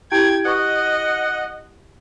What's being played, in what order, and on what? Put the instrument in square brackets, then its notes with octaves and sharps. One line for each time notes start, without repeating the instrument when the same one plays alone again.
[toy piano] E4 G4 [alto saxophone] G5 [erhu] G#6
[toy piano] B4 C#6 [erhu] D#5 [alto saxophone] F#5